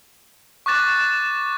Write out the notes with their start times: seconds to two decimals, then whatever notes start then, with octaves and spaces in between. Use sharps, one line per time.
0.66 C#6 D6 F#6 A6 E7